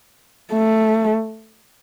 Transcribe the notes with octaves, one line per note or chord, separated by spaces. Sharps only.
A3